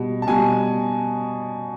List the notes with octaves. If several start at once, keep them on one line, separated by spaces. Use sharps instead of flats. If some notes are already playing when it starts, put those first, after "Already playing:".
Already playing: B2 G3
A5
B2 G3 G#5